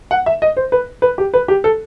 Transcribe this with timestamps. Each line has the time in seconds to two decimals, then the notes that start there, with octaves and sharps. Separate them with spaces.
0.11 F#5
0.26 E5
0.42 D#5
0.57 C5
0.72 B4
1.02 B4
1.18 G4
1.34 B4
1.48 G4
1.64 A4